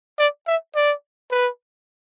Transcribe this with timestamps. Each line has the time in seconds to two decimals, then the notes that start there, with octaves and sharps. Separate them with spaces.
0.18 D5
0.47 E5
0.75 D5
1.31 B4